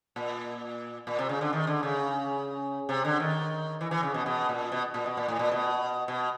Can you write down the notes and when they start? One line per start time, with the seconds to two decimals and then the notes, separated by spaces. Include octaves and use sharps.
0.16 A#2
1.07 A#2
1.19 C3
1.29 C#3
1.41 D3
1.53 D#3
1.67 D3
1.83 C#3
2.89 C3
3.05 D3
3.20 D#3
3.81 E3
3.91 E3
4.03 C#3
4.14 B2
4.26 B2
4.49 A#2
4.72 B2
4.94 A#2
5.06 B2
5.17 A#2
5.28 A2
5.39 A#2
5.51 B2
6.08 B2